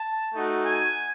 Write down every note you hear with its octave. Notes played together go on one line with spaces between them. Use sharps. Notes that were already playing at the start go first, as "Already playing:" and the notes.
Already playing: A5
A3 D#4 F#4
G#5